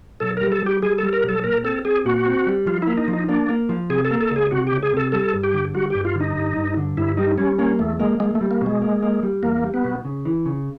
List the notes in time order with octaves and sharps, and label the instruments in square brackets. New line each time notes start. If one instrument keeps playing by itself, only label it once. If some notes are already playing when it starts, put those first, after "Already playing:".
[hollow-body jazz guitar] B1 [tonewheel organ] A4
[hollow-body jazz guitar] G3 [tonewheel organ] A#4
[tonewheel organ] A4
[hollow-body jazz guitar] G3 [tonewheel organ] G4
[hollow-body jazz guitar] G3 [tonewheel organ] G#4
[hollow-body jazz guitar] G3 [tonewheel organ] A4
[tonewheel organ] A#4
[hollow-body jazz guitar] B1
[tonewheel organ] A4
[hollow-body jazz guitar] A#2 [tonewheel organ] A#4
[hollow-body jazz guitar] C4 [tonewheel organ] A4
[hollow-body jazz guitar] C4 [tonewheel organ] G#4
[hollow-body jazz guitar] A#2 [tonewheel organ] F#4
[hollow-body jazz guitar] C4
G3
[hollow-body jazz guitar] F3 [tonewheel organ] F4
[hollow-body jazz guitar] A#3 [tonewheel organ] E4
[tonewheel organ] D#4
[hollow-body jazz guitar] F3
[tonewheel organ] D#4
[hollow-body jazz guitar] A#3 [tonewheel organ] D4
[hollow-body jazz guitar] A#3
F3
[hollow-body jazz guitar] C3 [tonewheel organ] G#4
[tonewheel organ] A4
[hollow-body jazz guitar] A#3
[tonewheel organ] A4
[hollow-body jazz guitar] C#2
[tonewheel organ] G#4
[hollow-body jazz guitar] C3 [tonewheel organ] F#4
[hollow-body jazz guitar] C#2 [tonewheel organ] G4
[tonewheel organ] G#4
[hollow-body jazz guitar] C3 [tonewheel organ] A4
[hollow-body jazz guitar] G3 [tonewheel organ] A4
[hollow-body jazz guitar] G2
[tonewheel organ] G4
[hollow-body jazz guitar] D3
[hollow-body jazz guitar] G3 [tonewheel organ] F#4
[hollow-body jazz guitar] G2 [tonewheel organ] G4
[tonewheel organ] F4
[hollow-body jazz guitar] D3
[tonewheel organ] D#4
[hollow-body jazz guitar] G2
G2
D3
[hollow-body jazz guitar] G2 [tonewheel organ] E4
[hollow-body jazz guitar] G3 [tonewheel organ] D#4
[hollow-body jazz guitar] G3 [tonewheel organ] C#4
[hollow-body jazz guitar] A#3 [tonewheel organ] C#4
[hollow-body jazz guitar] E2 [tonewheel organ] A3
[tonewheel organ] G#3 [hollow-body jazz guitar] A#3
[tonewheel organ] G#3 [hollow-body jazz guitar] A#3
[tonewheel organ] A3
[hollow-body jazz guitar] G3
[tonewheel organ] A#3
[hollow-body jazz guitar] B2
[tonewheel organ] G#3
[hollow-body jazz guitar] A#3
A#3
G3
[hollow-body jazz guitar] E2 [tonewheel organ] A#3
[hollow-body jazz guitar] G3
[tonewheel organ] B3
[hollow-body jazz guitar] B2
C#3
E3
C#3